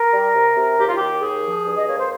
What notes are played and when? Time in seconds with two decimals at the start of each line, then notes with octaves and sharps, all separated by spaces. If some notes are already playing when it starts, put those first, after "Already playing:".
Already playing: A#4
0.13 G3
0.35 C3
0.56 C3
0.78 D#2 G4
0.87 F4
0.95 D#2 G4
1.21 D#2 G#4
1.43 F3
1.65 G2
1.77 D#5
1.87 A#3 C#5
1.98 C5